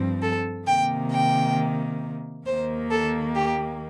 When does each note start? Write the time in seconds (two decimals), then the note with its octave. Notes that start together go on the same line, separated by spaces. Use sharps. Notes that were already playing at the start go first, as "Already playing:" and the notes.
Already playing: G2 F3 C4
0.22 A4
0.67 C3 D#3 A#3 G5
1.12 G5
2.46 D#2 D#3 A#3 C5
2.91 A4
3.36 G4